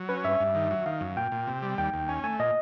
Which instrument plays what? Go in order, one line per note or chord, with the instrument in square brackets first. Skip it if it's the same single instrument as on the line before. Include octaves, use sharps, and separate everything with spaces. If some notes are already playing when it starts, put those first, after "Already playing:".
Already playing: [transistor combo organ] F#3
[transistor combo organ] C#4 [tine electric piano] B4
[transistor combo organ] G2 [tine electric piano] E5
[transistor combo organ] G2
D#3
F#3
[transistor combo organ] D#3 [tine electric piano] F5
[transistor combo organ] F#2
[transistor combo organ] A#2 [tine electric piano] G5
[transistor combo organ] A#2
C3
G3
[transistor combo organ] D#2 [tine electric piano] G5
[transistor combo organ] D#2
[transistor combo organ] C#4 [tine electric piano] G#5
[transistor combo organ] A3 [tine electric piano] G#5
[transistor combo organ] A#2 [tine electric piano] D#5